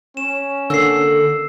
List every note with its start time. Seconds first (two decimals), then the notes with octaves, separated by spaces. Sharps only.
0.17 C#4 E7
0.70 D3 A#3 A4 E6 C7